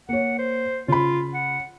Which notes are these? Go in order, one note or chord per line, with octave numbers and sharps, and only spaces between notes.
A#3 C#5 F#5
C5
C#3 F4 B5
F#5